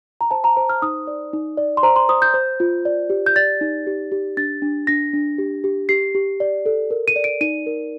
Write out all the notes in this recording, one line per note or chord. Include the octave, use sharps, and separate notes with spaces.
A#5
C5 A5
A#5
C5
F6
D#4 D#6
D5
D#4
D5
C6
C5 A#5
C6
C5 D#6
G6
C5
F4
D5
G4
G6
D5 A6
D#4
G4
G4
D4 A6
D4
D4 A#6
D4
G4
G4
G4 C7
G4
D5
A4
A#4
D#7
D5
D7
D#4 D#7
A#4